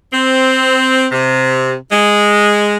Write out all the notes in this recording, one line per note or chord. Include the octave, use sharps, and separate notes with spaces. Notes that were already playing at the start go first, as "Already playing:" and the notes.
C4
C3
G#3